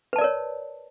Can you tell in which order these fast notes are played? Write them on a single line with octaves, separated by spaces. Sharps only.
B4 A5 D5 A#4 C#5